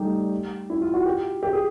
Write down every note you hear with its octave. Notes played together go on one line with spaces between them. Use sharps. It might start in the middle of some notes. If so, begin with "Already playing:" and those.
Already playing: G3 A3 D#4 G4
E4
F4
F#4
G4
G4
G#4